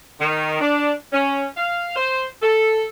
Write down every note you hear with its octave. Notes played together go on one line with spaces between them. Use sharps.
D#3
D4
C#4
F5
C5
A4